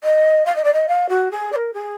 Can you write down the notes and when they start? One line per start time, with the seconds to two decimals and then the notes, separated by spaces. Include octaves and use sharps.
0.03 D#5
0.45 F5
0.55 D#5
0.64 D5
0.73 D#5
0.88 F5
1.09 F#4
1.31 G#4
1.52 D5
1.55 A#4
1.73 G#4